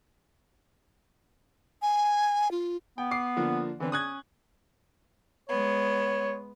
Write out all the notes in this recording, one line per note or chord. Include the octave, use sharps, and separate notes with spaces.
G#5
F4
B3 G5
D6 C7
D3 F3 A#3
D3 E3 C4
C#4 D#6 F#6 G#6
G#3 B3 C#5